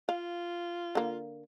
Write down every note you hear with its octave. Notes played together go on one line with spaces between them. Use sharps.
F4 F5
D3 A#3